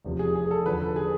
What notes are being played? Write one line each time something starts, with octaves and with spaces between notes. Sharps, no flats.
F1 E2 C3 F3
G#4
G#4
A4
E2 D3 F3 B4
A4
G#4